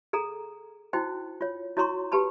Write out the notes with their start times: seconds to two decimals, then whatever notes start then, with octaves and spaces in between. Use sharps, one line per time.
0.13 G#4 A4 A#5
0.93 D#4 E4 F#4 C5 G5
1.41 F4 C#5
1.77 E4 F#4 C#5 A#5 C6 C#6
2.11 G4 B4 A5 B5 C6